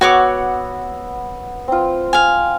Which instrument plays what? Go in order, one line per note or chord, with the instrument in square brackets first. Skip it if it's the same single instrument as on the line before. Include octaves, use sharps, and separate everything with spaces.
[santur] B3 F#5 E6 [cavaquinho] F#4 C#5 D6
[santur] C4 F4
[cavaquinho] F5 G#5